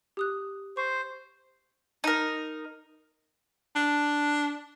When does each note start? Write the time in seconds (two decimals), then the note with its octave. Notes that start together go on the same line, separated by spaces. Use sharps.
0.17 G4 D#6 F#6
0.77 C5 C#6
2.04 D#4 A#4
3.75 D4